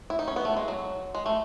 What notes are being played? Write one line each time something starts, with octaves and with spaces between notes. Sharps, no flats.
E4
D#4
C#4
B3
A3
G#3
F#3
G#3
A3